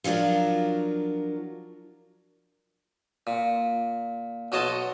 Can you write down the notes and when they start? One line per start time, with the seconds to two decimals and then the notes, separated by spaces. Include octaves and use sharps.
0.04 F3 F#3 D4 F4 A#4
3.27 A#2
4.52 B1 F#4 C#5 D#5 A5 C6